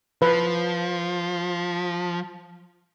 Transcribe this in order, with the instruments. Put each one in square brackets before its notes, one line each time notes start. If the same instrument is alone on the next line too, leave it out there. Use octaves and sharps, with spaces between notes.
[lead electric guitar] F3 [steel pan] B4